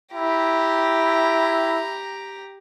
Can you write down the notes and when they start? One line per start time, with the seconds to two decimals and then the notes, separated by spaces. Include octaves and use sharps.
0.14 E4 G4 A#5